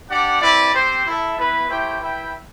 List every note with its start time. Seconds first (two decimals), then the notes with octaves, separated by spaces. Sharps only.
0.09 D4 G4 D5 F#5
0.41 C4 E4 B4 D5
0.73 C4 G4 C5
1.05 E4 A4 E5
1.37 B3 E4 B4
1.69 A3 E4 G4 C5 G5
2.01 E4 B4 E5 G5